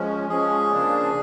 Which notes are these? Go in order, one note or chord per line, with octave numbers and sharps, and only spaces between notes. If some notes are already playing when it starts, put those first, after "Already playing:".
Already playing: F3 G#3 C#4
F3 G#3 C#4 G#4
C#3 F3 A#3 D4